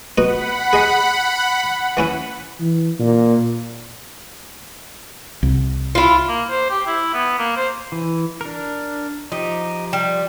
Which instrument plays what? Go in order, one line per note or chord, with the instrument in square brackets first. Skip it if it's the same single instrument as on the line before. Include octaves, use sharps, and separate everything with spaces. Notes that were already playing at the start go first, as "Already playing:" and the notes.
[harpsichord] B3 D#4 F#4 [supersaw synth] F#5 B5
[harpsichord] G#4 D#5 C6
E3 C#4 E4
[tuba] E3
A#2
[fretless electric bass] C2
[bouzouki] E4 F4
[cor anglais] A#3
C5
G4
E4
B3
A#3
C5
[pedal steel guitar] E3
D4 A#4
[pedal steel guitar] F3 G4 [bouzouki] D#4
[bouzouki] G3